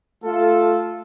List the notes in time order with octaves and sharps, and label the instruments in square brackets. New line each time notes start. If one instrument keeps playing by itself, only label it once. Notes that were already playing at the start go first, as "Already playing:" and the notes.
[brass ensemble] A3 F4 A4